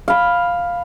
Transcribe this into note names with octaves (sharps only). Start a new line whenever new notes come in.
F5 B5